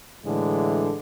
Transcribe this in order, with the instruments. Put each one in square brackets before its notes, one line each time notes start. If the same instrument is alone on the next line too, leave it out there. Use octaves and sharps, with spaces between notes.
[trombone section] A2 D3 E3 G#3